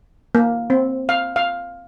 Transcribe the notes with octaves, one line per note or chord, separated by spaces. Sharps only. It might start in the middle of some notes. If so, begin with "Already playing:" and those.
A#3
C4
F5
F5